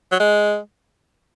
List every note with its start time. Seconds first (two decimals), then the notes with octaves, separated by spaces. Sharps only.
0.11 F#3
0.20 G#3